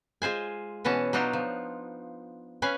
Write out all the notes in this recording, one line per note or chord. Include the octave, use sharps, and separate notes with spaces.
G#3 F4 C5 G#5
B2 E3 B3 C#4 A5
F#3 B3 D4 D#4 F4
F3
C#4 B4 F5 G#5